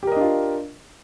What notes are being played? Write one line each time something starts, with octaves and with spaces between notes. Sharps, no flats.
D4 F4 G4 A#4 D#5